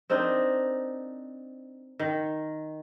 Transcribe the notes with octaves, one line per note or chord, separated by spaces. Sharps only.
C4 D4 D#4 A#4
D#3